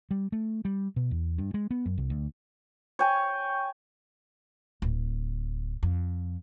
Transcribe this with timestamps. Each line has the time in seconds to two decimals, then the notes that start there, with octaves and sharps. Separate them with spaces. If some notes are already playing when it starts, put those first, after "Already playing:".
0.11 G3
0.32 A3
0.65 G3
0.96 B2
1.11 E2
1.38 G2
1.54 G#3
1.71 B3
1.86 F#2
1.98 C2
2.10 D2
2.99 C#5 G5 G#5
4.82 D1
5.83 F2